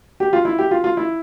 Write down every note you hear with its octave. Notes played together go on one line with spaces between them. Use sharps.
G4
F4
E4
G4
F4
F4
E4